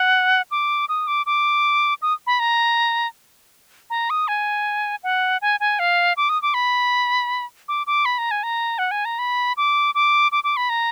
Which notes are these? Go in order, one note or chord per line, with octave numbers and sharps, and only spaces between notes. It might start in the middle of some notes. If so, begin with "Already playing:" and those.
Already playing: F#5
D6
D#6
D6
D6
D#6
B5
A#5
A#5
D#6
G#5
F#5
G#5
G#5
F5
D6
D#6
D6
B5
D6
D6
B5
A#5
G#5
A#5
F#5
G#5
A#5
B5
D6
D6
D6
D6
B5
A#5